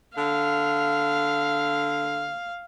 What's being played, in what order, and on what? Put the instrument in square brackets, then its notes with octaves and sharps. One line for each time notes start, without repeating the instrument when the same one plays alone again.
[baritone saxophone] D3 [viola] F5